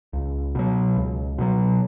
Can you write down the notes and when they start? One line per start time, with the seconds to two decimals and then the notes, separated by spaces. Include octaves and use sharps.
0.13 C#2
0.55 B2 F#3
0.97 C#2
1.38 B2 F#3